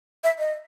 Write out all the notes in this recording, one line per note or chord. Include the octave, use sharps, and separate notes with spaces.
E5
D#5